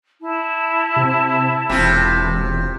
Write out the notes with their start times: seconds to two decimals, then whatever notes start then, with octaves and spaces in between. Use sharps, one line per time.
0.21 E4 A5
0.96 C3
1.70 E1 C3 F4